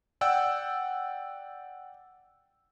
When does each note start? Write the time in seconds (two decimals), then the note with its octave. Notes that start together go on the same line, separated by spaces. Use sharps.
0.21 D5 F#5 G5 E6